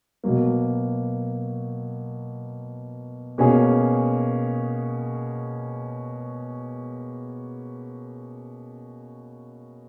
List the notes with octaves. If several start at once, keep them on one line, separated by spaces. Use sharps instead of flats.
B2 F#3 A#3
B2 A#3 C#4 G#4